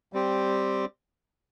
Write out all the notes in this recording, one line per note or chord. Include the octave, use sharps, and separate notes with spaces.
G3 C4 G4